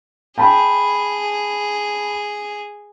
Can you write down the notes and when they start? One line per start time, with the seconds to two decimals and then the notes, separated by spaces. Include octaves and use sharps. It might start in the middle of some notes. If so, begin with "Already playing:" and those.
0.38 G#4 G5 A5 B5